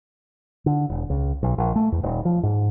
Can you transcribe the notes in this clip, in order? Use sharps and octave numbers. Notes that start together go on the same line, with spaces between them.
D3
E1
C#2
B1
A#1
A3
E2
D#1
F3
G#2